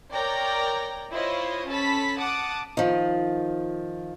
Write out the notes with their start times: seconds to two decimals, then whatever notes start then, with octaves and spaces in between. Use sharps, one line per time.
0.11 A#4 C#5 D5 G5 A#5
1.11 E4 F4 C5 C#5 D#5
1.67 C#4 A4 A5 B5 B6
2.19 F#5 A5 D6 D#6
2.77 D#3 F3